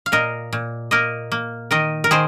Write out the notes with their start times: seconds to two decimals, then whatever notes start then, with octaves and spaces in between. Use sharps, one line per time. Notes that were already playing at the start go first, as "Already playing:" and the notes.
0.06 F5
0.12 A#2 A#4 D#5
0.53 A#2
0.91 A#3 A#4 D#5
1.32 A#3
1.71 D#3 A#4 D#5
2.04 A#4
2.11 D#3 G#4 C5